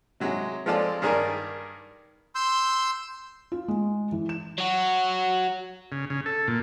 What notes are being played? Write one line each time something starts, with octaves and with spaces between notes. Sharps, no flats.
C3 F#3 G#3
F3 G#3 C4 F4 A4 D5
G2 D#3 G#4 A#4 D5
C6 E6 G6
F4
G#3
E3
E7
F#3 F#4
C#3
C#3
A4
A#2